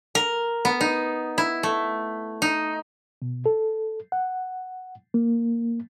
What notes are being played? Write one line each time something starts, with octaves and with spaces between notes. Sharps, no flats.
A#4
B3
D#4
E4
A3
D#4
B2
A4
F#5
A#3